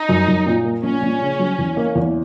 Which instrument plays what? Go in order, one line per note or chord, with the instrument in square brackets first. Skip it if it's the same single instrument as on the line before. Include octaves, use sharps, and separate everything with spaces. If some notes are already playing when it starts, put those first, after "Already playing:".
Already playing: [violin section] D#4
[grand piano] F#2
F#2
A#2
A#3
[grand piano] A#1 [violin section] C#4
[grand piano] A#1
C#3
F#3
E2
A#3
E2